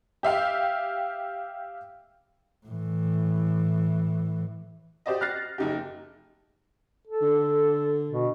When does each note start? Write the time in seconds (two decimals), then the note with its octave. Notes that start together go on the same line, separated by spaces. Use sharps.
0.23 G4 E5 F5 G5
2.66 A2 E3
5.06 G4 C5 D5 D#5
5.21 F6 F#6 A6 A#6 C7
5.58 F#1 D#4 G4
7.07 A4
7.22 D3
8.11 B2